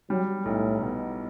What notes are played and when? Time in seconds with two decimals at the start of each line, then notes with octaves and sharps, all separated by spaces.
0.10 F#3 G3
0.45 B1 A2
0.81 B2